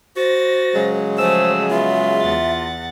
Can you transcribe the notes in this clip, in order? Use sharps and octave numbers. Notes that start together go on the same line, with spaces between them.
F#4 C5 A6 A#6
C#3 F#3 G#3
F3 A3 G#4 C5 E6
B3 F4 E5
E2 F#5 A6